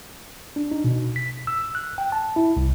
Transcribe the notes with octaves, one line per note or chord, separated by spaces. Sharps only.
D4
D#4
B2
B6
E6
F#6
G5
A5
E4
C2